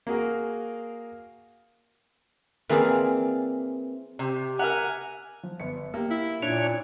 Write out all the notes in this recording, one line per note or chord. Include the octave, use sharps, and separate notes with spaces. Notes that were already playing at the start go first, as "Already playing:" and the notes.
A#3 F#4 G#4 A#4
E3 A#3 C4 G#4 D5 F5
C3 G4
A#4 E5 F#5 G#5 A#5 F#6
F3
G1 B3 C#7
A#3 G4
E4
A#2 D4 C#5 G#6